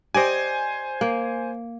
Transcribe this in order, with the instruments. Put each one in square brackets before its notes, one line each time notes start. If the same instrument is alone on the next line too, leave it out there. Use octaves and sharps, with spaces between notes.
[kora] G4 D5 D#5 [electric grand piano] C5 G#5
[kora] A#3